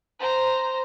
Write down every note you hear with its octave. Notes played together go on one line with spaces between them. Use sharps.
C5 A#5